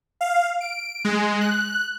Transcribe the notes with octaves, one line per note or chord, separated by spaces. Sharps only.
F5
D7
G#3
F#6